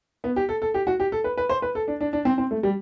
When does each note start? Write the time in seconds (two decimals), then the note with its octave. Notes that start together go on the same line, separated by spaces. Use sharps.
0.24 B3
0.36 G4
0.49 A4
0.62 A4
0.74 G4
0.87 F#4
1.00 G4
1.12 A4
1.24 B4
1.37 B4
1.49 C5
1.62 B4
1.75 A4
1.88 D4
2.01 D4
2.13 D4
2.25 C4
2.38 C4
2.51 A3
2.63 G3